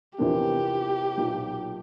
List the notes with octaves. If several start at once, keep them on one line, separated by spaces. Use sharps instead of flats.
E2 C3 F3 A#3 D4 G4
B1 A#2 F#3